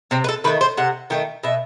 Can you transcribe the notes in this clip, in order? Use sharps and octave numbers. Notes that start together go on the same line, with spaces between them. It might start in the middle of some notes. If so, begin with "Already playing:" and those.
C3 C4
B4
A4
D#3 A3 B4
C5
C3 F#5
D#3 A3 G5
B2 E5